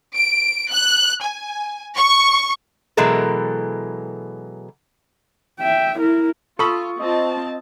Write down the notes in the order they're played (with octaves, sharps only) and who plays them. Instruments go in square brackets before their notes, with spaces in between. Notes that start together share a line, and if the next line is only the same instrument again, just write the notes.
[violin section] D7
F#6
G#5
C#6
[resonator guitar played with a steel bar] B2 E3 F#3 G#3 A4 A#4
[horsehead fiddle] E5 G5
E4 A#4
[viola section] F4 [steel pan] A4 B5 [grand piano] C#6 D#6
[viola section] C4 F4 A5 [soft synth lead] D#5